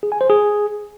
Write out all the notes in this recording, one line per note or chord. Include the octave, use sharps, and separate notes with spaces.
G#4
G#5
C5
G#4